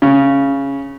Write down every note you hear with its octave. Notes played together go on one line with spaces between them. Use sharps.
C#3